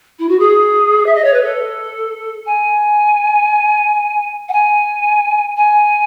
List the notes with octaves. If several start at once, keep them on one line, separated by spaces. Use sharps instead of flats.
E4
F#4
G#4
E5
D#5
C#5
B4
A4
G#5
F#5
G#5
G#5